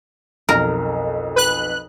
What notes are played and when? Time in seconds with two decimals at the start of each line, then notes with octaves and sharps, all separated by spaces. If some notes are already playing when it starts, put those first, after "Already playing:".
0.49 B1 F2 A#4
1.36 B4 F#6